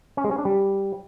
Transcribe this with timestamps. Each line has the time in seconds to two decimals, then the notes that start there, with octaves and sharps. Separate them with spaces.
0.17 C#4
0.24 G#3
0.31 C#4
0.38 D4
0.45 G3